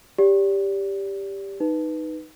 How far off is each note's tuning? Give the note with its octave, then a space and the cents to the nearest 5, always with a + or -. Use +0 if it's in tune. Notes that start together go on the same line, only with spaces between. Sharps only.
G4 +10 D5 -35
D#4 +0 B4 +0